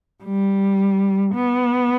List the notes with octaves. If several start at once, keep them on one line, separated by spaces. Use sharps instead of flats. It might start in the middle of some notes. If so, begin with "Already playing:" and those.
G3
B3